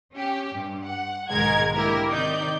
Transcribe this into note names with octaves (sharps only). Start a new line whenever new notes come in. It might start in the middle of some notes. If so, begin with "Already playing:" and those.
C#4 G4
G2
F#5
B1 G#2 D#3 G#3 A#4 G#6
D3 G#3 A#3 E4 G4 A#4
C3 D#3 D#4 D5 G6